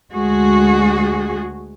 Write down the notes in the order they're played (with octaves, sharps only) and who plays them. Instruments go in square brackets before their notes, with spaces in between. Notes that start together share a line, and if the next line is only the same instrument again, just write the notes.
[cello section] D2 G#3 F#4 G#4